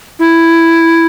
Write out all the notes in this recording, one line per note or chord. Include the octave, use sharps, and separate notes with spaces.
E4